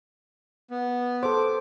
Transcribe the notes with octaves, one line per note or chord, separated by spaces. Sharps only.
B3
A4 C5 D6